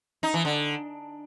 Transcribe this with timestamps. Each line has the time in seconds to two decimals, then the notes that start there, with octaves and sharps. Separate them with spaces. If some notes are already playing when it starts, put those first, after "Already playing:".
0.23 D#4
0.34 E3
0.45 D3